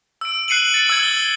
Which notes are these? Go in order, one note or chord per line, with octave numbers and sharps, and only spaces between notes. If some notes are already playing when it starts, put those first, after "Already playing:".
E6 D7
F#6 C7 C#7 D#7 F#7
A6 C#7
E6 G#6
G7